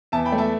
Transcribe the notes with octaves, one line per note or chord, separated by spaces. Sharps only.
E2 E5 A5
G5 B5
A3
E5 A5